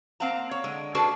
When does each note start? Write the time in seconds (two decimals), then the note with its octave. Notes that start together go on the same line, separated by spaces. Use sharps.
0.20 A#3 C4 F5 F#5 A#5
0.51 C#5
0.64 D3 G#3
0.95 A#3 D4 F#4 G#4 A4 B4